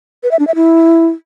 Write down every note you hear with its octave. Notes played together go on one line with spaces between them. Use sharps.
B4
E5
D4
E5
E4